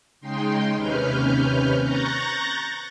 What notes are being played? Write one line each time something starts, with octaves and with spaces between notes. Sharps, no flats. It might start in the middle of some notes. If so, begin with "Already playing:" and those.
C#3 G#3 D#4 G5 C6
D#2 C3 C#4 B4 F6 G6
A#5 C#6 F#6 G6 A6 A#6